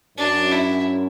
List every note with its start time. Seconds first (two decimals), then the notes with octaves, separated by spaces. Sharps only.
0.18 F#2 D4
0.51 E4